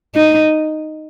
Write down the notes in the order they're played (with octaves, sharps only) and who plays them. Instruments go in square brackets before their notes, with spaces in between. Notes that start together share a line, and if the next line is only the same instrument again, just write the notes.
[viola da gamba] D#4